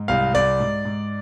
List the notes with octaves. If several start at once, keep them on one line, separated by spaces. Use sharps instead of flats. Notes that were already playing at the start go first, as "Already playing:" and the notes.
Already playing: G#2
C2 F5
C2 D5
G#2
G#2